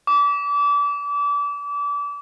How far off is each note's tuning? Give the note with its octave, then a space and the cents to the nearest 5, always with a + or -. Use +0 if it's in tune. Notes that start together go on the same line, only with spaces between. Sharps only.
D6 -30